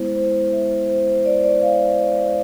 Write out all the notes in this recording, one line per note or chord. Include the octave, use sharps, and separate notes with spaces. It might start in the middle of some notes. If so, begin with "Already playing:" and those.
Already playing: G#3 B3 E4 C5
C5
E5
C5
C5
D5
D5
F5